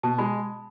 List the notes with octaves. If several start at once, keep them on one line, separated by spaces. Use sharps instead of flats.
B2 A5
G#3 B5